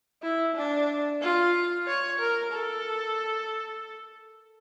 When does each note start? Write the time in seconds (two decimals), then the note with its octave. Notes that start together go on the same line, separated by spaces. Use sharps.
0.23 E4
0.56 D4
1.22 F4
1.87 C#5
2.20 A#4
2.53 A4